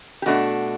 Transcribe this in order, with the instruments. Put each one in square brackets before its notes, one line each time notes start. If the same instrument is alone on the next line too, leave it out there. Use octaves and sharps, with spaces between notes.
[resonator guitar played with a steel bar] G4
B2 A3 D4 F#4